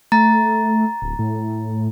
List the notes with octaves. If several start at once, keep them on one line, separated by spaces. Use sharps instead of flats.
A3 A#5 A6
D1
A2